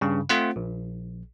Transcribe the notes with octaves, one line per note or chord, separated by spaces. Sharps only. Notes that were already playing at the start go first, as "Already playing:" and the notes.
G2 C#3
A3 C4 F4 C5 F#5
A#1